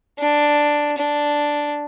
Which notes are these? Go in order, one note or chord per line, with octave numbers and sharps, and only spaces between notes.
D4
D4